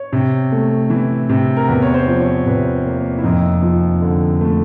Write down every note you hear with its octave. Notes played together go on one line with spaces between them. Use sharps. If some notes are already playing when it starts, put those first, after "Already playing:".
Already playing: C#5
C3
A3
E3
C3
A#4
E2 B4
C#5
C5
F3
C#5
C3 B4
A#3
E4
F2 D#4
F3
D3
A3